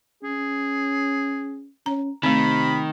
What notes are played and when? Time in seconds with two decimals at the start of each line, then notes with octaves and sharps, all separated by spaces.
0.23 C#4 G#4
1.86 C#4 A#5
2.23 C3 D#3 A3 C4 B5